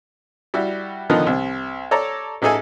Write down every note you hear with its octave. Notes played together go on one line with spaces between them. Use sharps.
G3 E4 F#4 G4
D3 D#3 F3 B3 D#4
C2
A4 C#5 D5 A5 A#5
A1 D#4 G#4 A4 G#5